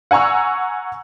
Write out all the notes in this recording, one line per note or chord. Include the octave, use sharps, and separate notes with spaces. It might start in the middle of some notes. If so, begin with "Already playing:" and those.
F#5 G#5 A#5 C#6 E6